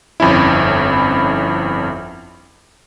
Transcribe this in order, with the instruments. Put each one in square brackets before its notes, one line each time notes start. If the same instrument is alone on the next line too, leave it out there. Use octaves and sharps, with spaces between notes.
[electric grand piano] G1 F2 C#4 E4